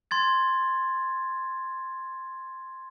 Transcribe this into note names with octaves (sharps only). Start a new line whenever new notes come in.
C6 G#6 A6